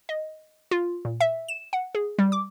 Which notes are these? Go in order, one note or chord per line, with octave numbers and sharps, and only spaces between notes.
D#5
F4
A#2
E5
E7
F#5
G#4
G3
D6